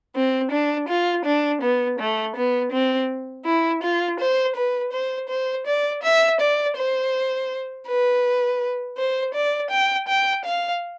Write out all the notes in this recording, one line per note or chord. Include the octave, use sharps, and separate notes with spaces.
C4
D4
F4
D4
B3
A3
B3
C4
E4
F4
C5
B4
C5
C5
D5
E5
D5
C5
B4
C5
D5
G5
G5
F5